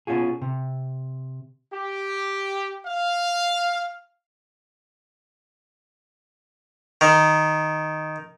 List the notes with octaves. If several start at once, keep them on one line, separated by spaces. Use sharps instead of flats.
B2 C#4 F4 F#4 G#4
C3
G4
F5
D#3